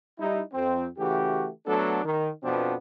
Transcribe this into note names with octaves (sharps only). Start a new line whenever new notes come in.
G3 D#4 E4
F2 C4
C#3 E3 A3 F#4 G4
F#3 A3 B3 D4 A4
D#3
F2 B2 F3 B3 C4 D4